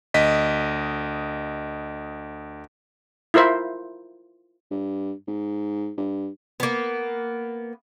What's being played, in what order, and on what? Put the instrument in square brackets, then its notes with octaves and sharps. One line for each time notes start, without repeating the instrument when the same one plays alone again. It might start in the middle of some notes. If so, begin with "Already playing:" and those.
[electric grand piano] D2 D#5 B6
[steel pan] E4 F4 A#4 C5 E5
[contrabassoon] G2
G#2
G2
[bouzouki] A#3 B3